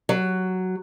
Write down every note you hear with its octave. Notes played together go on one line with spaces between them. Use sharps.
F#3